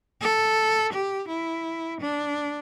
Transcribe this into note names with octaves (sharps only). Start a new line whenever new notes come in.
A4
G4
E4
D4